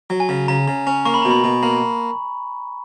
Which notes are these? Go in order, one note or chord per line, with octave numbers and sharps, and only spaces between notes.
F#3
G#5
C#3
C#3 A#5
C#3
C#4
A#3 C#6
B5
B2 A#5
B5
B2
A#3 B5